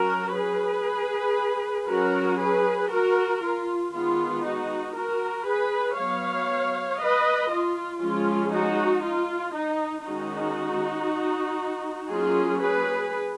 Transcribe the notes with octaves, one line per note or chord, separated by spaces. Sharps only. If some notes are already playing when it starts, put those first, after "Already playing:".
Already playing: F#3 C#4 F#4 A#4
G#4 B4
F#3 C#4 F#4 A#4
G#4 B4
F#4 A#4
F4
D#3 G#3 B3 F4
D#4 F#4
F#4 A#4
G#4 B4
F#3 B3 C#5 F5
B4 D#5
F4
F3 G#3 C#4 F4
D#4 F#4
F4
D#4
D#3 G#3 C#4 D#4 F#4
F#3 A#3 C#4 F4 G#4
G#4 B4